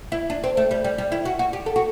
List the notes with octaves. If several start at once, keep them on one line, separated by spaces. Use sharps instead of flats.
E4
D4
C4
A3
G3
G3
G3
E4
F#4
F#4
G4
A4
F#4